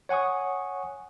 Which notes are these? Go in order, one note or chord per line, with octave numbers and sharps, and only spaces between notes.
C#5 F#5 G#5 C#6 D#6